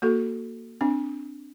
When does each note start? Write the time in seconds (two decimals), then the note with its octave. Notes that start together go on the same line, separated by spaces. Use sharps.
0.02 A#3 F#4 A4
0.81 C4 D4